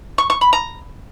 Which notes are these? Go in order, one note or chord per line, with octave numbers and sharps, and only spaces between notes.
C#6
C#6
B5
A#5